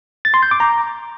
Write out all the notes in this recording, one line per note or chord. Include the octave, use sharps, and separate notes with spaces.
A6
C6
G6
D6
A#5